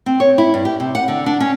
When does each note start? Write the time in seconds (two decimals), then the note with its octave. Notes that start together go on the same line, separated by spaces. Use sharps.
0.06 C4
0.20 C#5
0.38 E4
0.54 G2
0.65 G4
0.80 C3
0.95 F#5
1.08 D3
1.26 D4
1.40 C#4